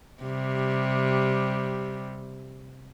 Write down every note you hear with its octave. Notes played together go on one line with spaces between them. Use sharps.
C3 G3